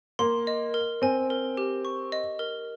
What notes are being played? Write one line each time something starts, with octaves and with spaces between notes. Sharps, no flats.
A#3 C6
D#5
A#4
C4 G#5
A#4
G4
C#6
D#5
A#4